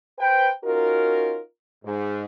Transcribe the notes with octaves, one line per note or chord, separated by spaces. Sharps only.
B4 C5 G5
C#4 D#4 F4 F#4 A#4
G#2